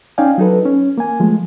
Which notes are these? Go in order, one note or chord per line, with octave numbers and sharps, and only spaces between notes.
C#4 D#4 D5 F5 G5 G#5
F#3 D#4 A4 B4
C#4
A#3 G#5
F3 G#3 A3